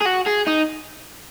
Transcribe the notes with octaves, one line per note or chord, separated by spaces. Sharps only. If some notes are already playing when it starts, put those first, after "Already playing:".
G#4
F#4
G#4
D#4